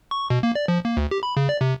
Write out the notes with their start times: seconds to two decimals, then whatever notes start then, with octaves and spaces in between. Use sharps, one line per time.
0.11 C#6
0.30 B2
0.43 A#3
0.55 D5
0.68 F3
0.85 A#3
0.97 D2
1.11 G4
1.23 B5
1.37 C#3
1.49 D5
1.61 C3